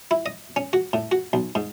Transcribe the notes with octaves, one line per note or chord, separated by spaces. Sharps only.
E4
D#5
C#4
F#4
A2
F#4
B1
G#2